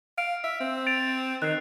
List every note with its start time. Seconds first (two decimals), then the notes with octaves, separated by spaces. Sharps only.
0.18 F5 D7
0.44 E5
0.61 C4
0.87 A6 D7 F7
1.42 D#3 F#6 C7